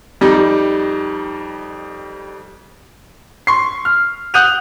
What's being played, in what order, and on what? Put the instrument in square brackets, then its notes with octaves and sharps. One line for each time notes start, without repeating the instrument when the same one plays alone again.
[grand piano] F2 G3 D#4
C6 C#6 C7
F6
F#5 D#6 F#6 G6 D#7 F7